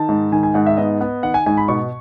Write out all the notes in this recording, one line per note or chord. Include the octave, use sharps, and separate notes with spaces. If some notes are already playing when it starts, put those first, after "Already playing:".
Already playing: D#3 A5
G#2
D#3 G#5
G#5
G#2 F#5
E5
B3 D#5
B3
D#3 F#5
G#5
G#2 G#5
B5
B2 C#6